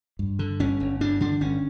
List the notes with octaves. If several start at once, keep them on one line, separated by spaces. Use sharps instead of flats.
G2
D3
G1 C#4
G1
G2 D4
D3 D4
G1 C#4